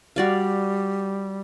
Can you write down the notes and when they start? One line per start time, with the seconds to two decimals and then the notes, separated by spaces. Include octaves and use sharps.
0.16 G3 F#4 D5 F5